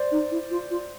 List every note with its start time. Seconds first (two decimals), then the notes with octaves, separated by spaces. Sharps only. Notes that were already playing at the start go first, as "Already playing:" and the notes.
Already playing: C5 D5
0.11 D#4
0.31 E4
0.51 F4
0.70 F4